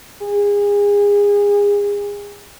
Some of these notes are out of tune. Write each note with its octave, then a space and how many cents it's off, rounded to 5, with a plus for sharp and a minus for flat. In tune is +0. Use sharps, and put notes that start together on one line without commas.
G#4 -30